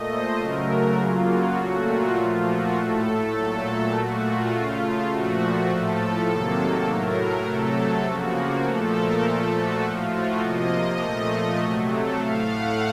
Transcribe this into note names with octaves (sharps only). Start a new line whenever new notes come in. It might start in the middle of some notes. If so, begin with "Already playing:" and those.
Already playing: A#2 A3 D#5
C5
C#3 F#3 A3 A#4
F#4
C#3 F#3 A#3 F4
F#4
A#2 F#3 A3 F#4
F4
A#2 F3 A3 F4
F#4
A2 A3 A4
A#2 F#3 A3 A4
A#2 A3 F#4
F4
C#3 A3
A#2 F3 A3 F#4
A2 F3 A3 A4
C3 D#3 F#3 A#3
A2 F#3 A3 A#4
A#4
C3 F#3 A3 A4
C#3 F3 A#3 F#4
F#4
A#2 F3 A3 A4
A#4
A#2 F3 A3 A4
F#4
A2 F3 A3 F4
F#4
C3 F3 A#3 D#5
A#2 F3 A3
C3 F#3 A3
A4
A2 A3 F5
F#5